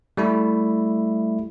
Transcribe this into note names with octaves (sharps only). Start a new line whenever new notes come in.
G3 A3 E4